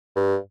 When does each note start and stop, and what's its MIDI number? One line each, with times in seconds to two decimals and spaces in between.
0.16 0.37 43